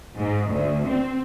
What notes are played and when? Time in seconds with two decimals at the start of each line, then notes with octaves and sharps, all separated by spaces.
0.17 G#2
0.53 D2
0.87 C4